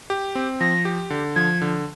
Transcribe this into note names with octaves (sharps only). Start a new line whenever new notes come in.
G4
C4
F3 A#6
G4
D3
F3 G#6
D3